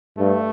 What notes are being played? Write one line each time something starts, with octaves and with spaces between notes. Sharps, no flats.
G2 A3